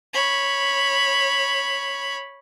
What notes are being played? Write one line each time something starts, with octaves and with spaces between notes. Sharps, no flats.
C#5 B5